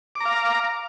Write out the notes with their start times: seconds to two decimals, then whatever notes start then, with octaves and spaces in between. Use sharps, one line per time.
0.15 D6
0.20 A#5
0.25 F5